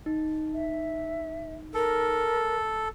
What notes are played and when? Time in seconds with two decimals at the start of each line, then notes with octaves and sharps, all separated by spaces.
0.06 D#4
0.53 E5
1.74 A4 A#4